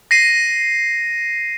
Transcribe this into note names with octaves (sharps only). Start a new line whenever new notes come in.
A#6 C7 D#7